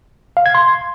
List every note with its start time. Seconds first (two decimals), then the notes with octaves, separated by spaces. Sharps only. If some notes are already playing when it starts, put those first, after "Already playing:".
0.37 F5
0.46 G#6
0.55 C6